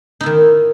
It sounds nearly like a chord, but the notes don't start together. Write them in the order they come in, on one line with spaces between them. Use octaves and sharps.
D#4 E4 D#3